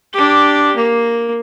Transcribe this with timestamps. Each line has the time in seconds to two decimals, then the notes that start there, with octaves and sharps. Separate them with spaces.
0.13 D4 G4
0.76 A#3